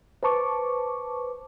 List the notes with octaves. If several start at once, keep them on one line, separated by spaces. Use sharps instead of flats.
B4 C5 A5 C#6 D6